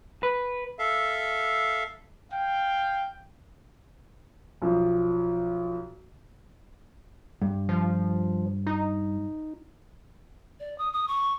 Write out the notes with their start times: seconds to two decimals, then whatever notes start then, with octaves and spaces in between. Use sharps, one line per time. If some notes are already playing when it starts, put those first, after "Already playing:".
0.23 B4
0.79 A4 E5 F5
2.32 F5 G5
4.62 B1 F3
7.42 G2
7.69 F3
8.67 D#4
10.60 D5
10.78 D#6
10.93 D#6
11.08 C#6